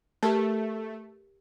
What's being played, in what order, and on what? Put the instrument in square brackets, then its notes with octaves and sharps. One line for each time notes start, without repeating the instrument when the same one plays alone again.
[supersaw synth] A3 [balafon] G4 A#4 A5